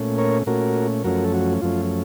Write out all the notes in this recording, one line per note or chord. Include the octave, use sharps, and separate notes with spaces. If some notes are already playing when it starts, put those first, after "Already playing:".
Already playing: A#2 A3 C#4
A#4 C#5
A#2 A3 C#4 F#4 A#4
F#2 F3 A3 C#4 F#4 A#4
A4
F#4
F#2 F3 A3 C#4 F4